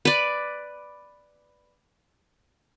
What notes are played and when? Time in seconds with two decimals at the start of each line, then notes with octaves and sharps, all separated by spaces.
0.05 B4 D5